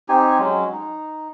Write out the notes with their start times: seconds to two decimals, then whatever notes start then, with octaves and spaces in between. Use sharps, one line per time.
0.09 C4 D#4 G4 G#5
0.39 F#3 G#3 C#4
0.72 D#4